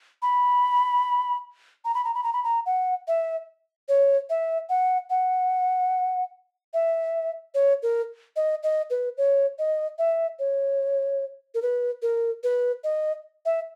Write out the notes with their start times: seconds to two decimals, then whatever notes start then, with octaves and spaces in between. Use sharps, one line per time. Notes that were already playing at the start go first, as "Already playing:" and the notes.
0.22 B5
1.85 A#5
1.95 B5
2.04 A#5
2.15 B5
2.24 A#5
2.33 B5
2.44 A#5
2.66 F#5
3.08 E5
3.89 C#5
4.30 E5
4.69 F#5
5.10 F#5
6.74 E5
7.54 C#5
7.83 A#4
8.36 D#5
8.63 D#5
8.90 B4
9.18 C#5
9.59 D#5
9.99 E5
10.39 C#5
11.55 A#4
11.62 B4
12.02 A#4
12.43 B4
12.84 D#5
13.46 E5